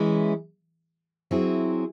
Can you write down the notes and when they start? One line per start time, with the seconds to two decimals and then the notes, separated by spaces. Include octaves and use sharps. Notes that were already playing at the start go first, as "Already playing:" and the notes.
Already playing: E3 G#3 C#4 E4
1.31 F#3 C4 E4 G#4